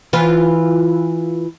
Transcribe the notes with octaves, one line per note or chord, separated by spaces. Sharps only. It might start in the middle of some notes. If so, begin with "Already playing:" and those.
E3 F4 B4